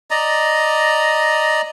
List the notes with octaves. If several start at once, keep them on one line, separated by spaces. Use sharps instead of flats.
D5 D#5 A#5